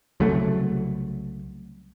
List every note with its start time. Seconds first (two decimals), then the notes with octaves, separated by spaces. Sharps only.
0.20 C2 C#3 F#3 A3